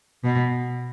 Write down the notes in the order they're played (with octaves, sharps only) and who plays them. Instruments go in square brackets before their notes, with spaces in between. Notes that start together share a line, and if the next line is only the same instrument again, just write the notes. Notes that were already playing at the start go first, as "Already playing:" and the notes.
[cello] B2